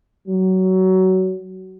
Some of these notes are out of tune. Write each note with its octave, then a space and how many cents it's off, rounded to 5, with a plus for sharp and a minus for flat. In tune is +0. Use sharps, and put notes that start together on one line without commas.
F#3 +20